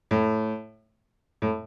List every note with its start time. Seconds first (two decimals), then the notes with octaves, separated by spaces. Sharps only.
0.11 A2
1.42 A2